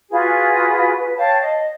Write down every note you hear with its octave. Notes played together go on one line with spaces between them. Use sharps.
F4 F#4 G#4 B4
B4
C#5 F5 G5 A5
D#5